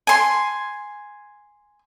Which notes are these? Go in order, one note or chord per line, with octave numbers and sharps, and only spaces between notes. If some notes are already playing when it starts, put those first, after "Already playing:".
G#5 C6